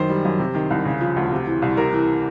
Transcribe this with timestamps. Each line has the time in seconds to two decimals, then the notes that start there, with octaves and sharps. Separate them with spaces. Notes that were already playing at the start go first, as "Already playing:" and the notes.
Already playing: F#2 D#3 C5
0.10 G3
0.25 F#2
0.39 C3
0.55 D#3
0.70 C2
0.85 C#3
1.01 F3
1.16 D2
1.31 C3
1.47 E3
1.62 C2
1.77 C3 A#4
1.93 E3